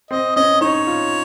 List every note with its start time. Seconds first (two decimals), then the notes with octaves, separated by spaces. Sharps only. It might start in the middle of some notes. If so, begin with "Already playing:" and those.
0.11 C4 D#5
0.36 C#4 D#5
0.61 D#4 C#5
0.87 F4